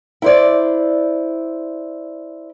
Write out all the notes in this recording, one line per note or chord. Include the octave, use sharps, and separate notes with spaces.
E4 C5 D5